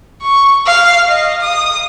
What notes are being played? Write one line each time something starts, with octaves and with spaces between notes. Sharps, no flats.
C#6
F5
D#5
D#6